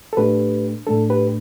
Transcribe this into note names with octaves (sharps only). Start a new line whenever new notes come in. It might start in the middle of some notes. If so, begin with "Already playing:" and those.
A4
A2 A3 D4 G4 B4
A2 A3 D4 A4
G4 B4